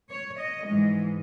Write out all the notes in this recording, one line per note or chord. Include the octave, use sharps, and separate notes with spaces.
C#5
D#5
G#2 E3 G#3